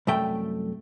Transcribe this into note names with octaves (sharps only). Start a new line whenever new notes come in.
C2 F#2 A3 G5